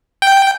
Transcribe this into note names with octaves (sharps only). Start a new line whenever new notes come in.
G5